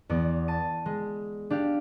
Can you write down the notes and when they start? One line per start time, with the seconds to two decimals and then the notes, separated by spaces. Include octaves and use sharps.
0.09 E2 B3 D5
0.48 A5 D#7
0.86 G#3
1.50 D4 G4 F5